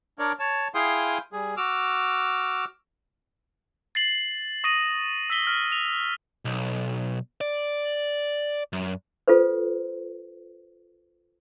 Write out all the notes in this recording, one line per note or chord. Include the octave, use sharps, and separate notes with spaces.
D4 A#4 C#5 D5
C#5 A5
E4 G#4 F5 G5 C6 D#6
G3 G#4
F#4 D6 E6 F6
A6 C7 F#7
C#6 D#6 A#6 C7 D#7 F#7
E6 B6 G7
F6
F7
B1
D5
F#2
F4 A4 B4 C5